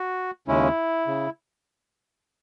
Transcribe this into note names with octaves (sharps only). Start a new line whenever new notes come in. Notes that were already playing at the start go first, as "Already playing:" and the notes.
Already playing: F#4
D#2 C#3 G#3 C#4 E4
C#3